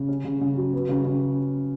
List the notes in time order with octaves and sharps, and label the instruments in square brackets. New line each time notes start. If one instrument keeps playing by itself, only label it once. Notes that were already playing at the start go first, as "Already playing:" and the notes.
Already playing: [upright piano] C#3
C#4
C#3
C#3
F#3
B3
C#3
C#3